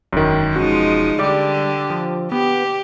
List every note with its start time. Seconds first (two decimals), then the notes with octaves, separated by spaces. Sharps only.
0.13 E1 F#2 D#3
0.55 F3 G#3 C#4 D#4 F#4
1.19 D3 G3 G4 D5 D6
1.90 F3
2.32 B3 G4